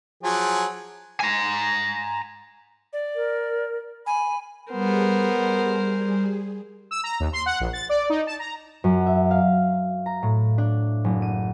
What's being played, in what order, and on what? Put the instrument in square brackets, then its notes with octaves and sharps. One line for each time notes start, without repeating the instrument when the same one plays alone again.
[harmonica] F3 F#3 G#4
[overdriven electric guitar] G#5 A#5
[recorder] D5
[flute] A#4
[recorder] G#5 [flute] B5
[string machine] G3 G#4 [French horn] B3 [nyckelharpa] A#4 C5
[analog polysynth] E6
A#5
D#2
C6
F#5
A#1
A6
D5
D#4
A5
A#5
[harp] F#2
E5
F5
A#5
A2
D4
F#1
D#7